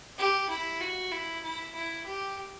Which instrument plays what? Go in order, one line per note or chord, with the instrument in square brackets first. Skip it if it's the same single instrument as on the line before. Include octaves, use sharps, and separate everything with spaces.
[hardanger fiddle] G4
E4
F#4
E4
E4
E4
G4